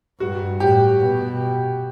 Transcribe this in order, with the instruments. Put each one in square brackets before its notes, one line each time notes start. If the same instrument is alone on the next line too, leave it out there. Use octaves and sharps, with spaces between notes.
[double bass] G2 [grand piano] F#4
[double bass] A2 [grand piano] G4
[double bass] B2